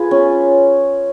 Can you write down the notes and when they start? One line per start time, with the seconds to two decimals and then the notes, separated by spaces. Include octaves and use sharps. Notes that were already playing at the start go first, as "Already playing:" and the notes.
Already playing: F4 G#4 B4
0.11 C#4